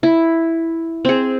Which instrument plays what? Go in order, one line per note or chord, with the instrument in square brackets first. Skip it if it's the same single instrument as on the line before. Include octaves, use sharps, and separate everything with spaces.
[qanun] E4
C4 G#4